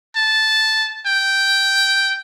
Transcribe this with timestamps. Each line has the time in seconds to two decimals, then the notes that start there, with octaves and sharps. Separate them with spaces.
0.16 A5
1.06 G5